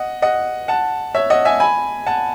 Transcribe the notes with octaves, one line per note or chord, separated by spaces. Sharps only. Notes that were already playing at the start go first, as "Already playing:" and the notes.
Already playing: D#5 F#5
D#5 F#5
F#5 A5
C#5 E5
D#5 F#5
E5 G#5
G#5 B5
F#5 A5